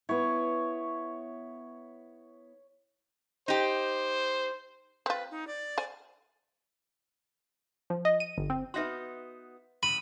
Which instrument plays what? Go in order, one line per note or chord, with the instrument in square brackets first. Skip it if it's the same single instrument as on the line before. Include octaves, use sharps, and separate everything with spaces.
[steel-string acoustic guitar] B3 E4 [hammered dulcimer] C#5
[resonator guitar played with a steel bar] D#4 G4 [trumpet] C5
[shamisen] C4 F4 [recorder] B4
[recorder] D#4
D5
[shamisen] C5 G#5
[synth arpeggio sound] F3
D#5
D#7
G1
C4
[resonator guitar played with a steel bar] B3 D#4 F#4 [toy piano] B4 E5 C6
[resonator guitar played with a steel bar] A2 C#3 [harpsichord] B5 [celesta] D#7